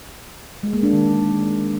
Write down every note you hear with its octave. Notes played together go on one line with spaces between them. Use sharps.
G#3
A#3
D4
D#3